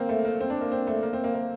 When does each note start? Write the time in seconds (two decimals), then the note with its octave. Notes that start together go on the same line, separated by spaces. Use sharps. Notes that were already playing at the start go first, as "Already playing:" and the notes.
Already playing: A#3 C4
0.09 A3
0.25 A#3
0.40 C4
0.50 D4
0.61 A#3
0.72 C4
0.87 A3
1.02 A#3
1.13 C4
1.24 A#3
1.34 A#3